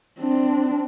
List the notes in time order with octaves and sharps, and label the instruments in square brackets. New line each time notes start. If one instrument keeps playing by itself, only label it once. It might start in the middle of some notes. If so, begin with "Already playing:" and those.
[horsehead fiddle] C4 D4